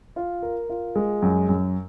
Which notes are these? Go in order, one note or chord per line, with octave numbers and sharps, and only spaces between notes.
F4
A#4
F4
G#3
F#2
F#2